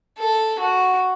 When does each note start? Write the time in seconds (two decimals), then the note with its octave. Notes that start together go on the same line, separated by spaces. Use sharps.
0.18 A4
0.60 F#4